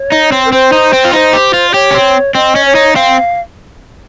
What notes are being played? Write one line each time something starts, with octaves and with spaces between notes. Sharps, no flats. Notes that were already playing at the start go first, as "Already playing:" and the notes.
Already playing: C#5
D#4
C4
A#4
C4 C5
D#4
C4
F4
D#4 C5
G4
F4
D#5
G4 C#5
C#4
C4
C4 D#5
C#4
C#5
D#4
C4 F5